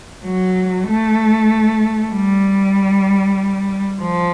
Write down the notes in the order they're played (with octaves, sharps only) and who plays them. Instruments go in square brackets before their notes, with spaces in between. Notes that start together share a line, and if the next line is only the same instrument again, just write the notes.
[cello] F#3
A3
G3
F3